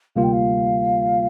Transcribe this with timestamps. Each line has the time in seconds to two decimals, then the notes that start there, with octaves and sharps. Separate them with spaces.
0.16 D2 C3 G3 A#3 F4 F5
0.23 G5
0.32 F5